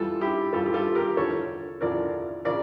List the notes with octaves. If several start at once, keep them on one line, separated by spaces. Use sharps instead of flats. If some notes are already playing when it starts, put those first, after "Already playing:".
Already playing: F2 E3 G3 F4 A4
E4 G4
F2 E3 G3 F4 A4
G4
F4 A4
G4 A#4
E2 D3 F3 A4 C#5
E2 D3 F3 A#4 D5
C#3 F3 A#4 D5